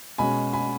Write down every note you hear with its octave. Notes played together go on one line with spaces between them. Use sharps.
B2 G#3 C#4 G#5 B5
G#5 B5